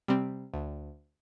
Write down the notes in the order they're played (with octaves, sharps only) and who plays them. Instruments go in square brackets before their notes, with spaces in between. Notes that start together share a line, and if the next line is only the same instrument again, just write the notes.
[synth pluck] C3 G3 C4
D2